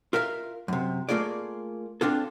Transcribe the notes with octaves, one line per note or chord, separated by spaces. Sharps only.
F4 A#4 E5 F5
F#2 C3
A3 A#3 F4 G#4 D5
C4 D4 F4 A4